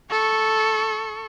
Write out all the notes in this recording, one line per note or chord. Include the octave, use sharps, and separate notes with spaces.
A4 C#6